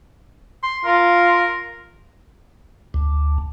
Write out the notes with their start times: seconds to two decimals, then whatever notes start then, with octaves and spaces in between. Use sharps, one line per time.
0.63 C6
0.85 F4 A#4
2.94 D2